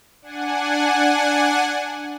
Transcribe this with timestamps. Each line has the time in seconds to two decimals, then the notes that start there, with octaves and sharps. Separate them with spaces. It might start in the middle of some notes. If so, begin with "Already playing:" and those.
0.22 D4 F#5 G#5